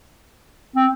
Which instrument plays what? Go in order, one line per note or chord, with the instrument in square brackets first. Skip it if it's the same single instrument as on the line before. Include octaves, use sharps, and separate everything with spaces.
[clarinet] C4